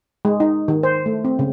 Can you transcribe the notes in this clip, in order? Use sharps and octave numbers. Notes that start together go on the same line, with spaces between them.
G#3
D#4
D#3
C5
A3
C4
C#3